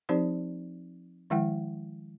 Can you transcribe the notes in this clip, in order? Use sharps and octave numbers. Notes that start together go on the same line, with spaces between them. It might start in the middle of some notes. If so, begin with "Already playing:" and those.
F3 C4 D#4 G4 C5 D5
D#3 F3 G#3 E4 F#5 G5